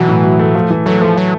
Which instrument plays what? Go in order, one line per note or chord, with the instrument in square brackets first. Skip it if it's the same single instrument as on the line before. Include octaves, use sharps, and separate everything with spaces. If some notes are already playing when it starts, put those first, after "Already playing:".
Already playing: [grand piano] B2 F#3 [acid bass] E3
[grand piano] A2
F#3
A3
[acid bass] F3 [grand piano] A3
[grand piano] E3
[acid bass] F#3 [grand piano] A3
[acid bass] F3 [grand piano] A3
[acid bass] F#3